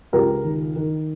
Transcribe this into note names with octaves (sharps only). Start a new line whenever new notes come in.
C#2 G4 A#4
D#3
D#3